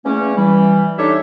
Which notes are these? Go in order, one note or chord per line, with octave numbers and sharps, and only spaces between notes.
E2 A3 A#3 C#4
E3 G3
D4 D#4 G4 A4 C#5 E5